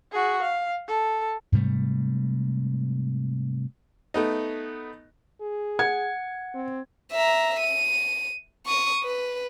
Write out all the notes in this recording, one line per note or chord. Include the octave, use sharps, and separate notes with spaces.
F#4 G#4
F5
A4
G#2 C3 G3 A3
A3 B3 D#4
G#4
F#5 G#6
C4
E5 A#5
D#7
C#6 D#6
B4